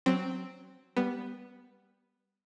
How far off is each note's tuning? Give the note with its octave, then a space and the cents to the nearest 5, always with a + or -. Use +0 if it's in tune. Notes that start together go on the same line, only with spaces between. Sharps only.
F#3 +0 C4 +0
G3 +0 B3 +0